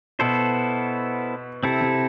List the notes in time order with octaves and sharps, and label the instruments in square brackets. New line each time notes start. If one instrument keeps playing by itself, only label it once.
[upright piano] B2 [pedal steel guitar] B3 E4 A4 C5
[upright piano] C3 [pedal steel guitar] C4 E4 A4
[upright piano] C3